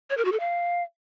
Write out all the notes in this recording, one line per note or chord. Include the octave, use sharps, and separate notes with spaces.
C#5
A#4
F#4
A4
F5